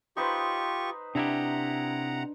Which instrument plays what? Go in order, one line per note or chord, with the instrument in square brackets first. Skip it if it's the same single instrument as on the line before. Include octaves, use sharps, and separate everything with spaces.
[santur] D#4 B4 C5 [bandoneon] F4 G4 C#6
[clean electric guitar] C3 E4 G4 [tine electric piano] D4 [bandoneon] F#5 A#5